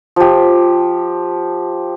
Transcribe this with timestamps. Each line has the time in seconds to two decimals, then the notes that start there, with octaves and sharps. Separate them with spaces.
0.16 F3 G4